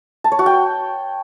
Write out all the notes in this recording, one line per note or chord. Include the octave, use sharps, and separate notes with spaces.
A5
C#5
F#4
G5